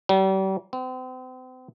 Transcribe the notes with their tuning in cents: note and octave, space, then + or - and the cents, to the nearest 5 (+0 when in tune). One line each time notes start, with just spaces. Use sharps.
G3 -40
C4 -40